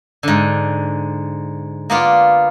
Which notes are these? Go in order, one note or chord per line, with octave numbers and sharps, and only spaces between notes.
G#2 D3
A#3 B3 F4 D5